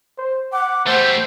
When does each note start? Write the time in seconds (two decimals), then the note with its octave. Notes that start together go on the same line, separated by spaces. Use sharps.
0.18 C5
0.53 F#5 D6
0.87 G3 A3 C5